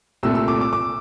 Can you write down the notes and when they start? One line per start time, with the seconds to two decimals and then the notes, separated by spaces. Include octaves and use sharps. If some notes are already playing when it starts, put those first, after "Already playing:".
0.23 C2 A#2 A3 E6
0.35 E6
0.48 D6
0.61 D6
0.73 D6